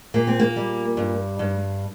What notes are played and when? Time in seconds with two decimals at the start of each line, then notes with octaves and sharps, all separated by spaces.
0.14 A#2 A#3
0.27 C4
0.40 A#3
0.56 G3
0.97 G2
1.39 G2